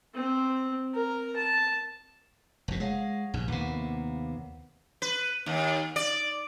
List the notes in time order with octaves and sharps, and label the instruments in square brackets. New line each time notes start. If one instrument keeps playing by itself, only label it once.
[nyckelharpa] C4
A#4
A5
[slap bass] F1 A#2
[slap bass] G#3 [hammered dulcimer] C#5 F5 F#5
[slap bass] A#1 G2
[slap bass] D#2 C3 [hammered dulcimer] A#3 B3
[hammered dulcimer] E5
[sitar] B4
D#2
D5